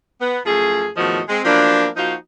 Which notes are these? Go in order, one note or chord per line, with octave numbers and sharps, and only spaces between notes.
B3
F#2 F3 A3 G#4
E2 A2 D#3 F3 F#4 D#5
G#3 C4
F3 F#3 A#3 B3 D4
F3 A#3 D#4 F4 F#4